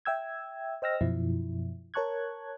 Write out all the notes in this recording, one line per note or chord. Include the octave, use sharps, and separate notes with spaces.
E5 G5 E6 G#6
C5 D#5 G5 E6 F6 A#6
F#2 B2 F3 E4
A#4 C#5 A5 C#6 F#6 G#6